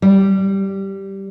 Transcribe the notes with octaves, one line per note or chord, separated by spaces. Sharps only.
G3